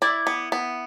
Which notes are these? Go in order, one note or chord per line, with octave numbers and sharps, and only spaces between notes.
E4 D5
B3
B3